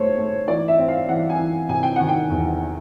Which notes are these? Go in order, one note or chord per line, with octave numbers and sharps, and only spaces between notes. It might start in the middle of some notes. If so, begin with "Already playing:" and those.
Already playing: G#2 A3 C5 C#5
A3
E3 D5
E5
C4
F5
E3 F#5
G#5
E3
C3 G#5
G5
D#3 F#5
G5
E2